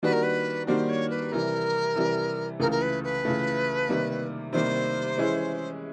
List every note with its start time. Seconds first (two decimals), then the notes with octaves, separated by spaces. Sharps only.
0.03 D#3 G3 A#3 D4 F#4 B4
0.12 A#4
0.22 B4
0.67 D#3 G3 A#3 D4 F#4 C5
0.89 C#5
1.10 B4
1.32 C3 E3 G3 A#4
1.96 C3 E3 G3
2.60 C#2 C#3 E3 A3 A#4
2.71 A#4
2.81 B4
3.03 B4
3.25 C#2 C#3 E3 A3
3.89 C3 D#3 G3 A#3
4.53 C3 D#3 G3 A#3 C5
5.18 E3 G#3 C#4 E4 G#4